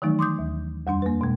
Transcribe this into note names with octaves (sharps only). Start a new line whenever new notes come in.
D#3 E3 F#3 G3 A3 D#4
C6 D6 D#6 G6
D#2
F2 G3 D4 C6
A#3 B4
B2 G#3